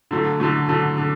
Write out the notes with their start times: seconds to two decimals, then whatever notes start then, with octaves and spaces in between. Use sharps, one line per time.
0.11 D3 F#3 A3
0.40 D3 F#3 A3
0.69 D3 F#3 A3
0.98 D3